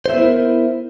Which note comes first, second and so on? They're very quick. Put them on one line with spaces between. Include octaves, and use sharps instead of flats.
C5 E5 B3 E4 A#4